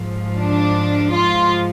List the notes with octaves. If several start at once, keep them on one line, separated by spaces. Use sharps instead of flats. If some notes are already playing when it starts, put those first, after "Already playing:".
Already playing: G#2 F3
D4
F4